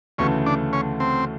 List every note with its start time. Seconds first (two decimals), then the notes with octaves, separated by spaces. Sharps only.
0.18 D2 C#3 E3 A3 C#4
0.46 D4
0.73 C#4
1.00 C4